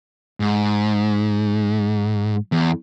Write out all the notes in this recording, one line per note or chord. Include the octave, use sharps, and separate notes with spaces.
G#2
E2